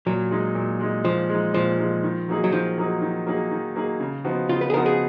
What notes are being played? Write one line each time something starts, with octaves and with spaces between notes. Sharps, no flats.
A#2 F#3
G#3 D#4
A#2
G#3 D#4
A#2 F3
G#3 D#4
A#2 F3
G#3 D#4
D#3
F#3 A#3 D#4 G#4
F#3
D#3 F3
F#3 A#3 D#4 G#4
D#3
F#3 A#3 D#4 G#4
D#3
F#3 A#3 D#4 G#4
C#3
F3 B3 D#4 F#4
C#3 F4
B4
G#4
F3 B3 D#4 F#4 A#4
G#4